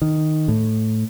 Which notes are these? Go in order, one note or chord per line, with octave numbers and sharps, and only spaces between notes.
D#3
A2